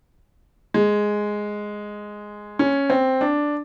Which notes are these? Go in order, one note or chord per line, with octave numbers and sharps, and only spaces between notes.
G#3
C#4
C4
D4